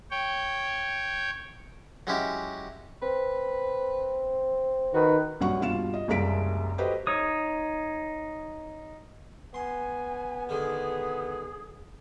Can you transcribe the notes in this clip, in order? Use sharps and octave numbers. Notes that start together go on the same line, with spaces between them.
C#5 G5
F#3 G#3 C#4 E4 G4
C4 B4
D#3 F#4 B4
A#1 G2 A#2 F#3 F#5 C#6
G2 B2 F4 F5 E7
D#5
F#1 C2 G#3 F5 B6 D7
F#4 G4 A4 B4 C5 D#5
D#4 C#5 D#6
B3 G#5 C6
D3 D#3 G#4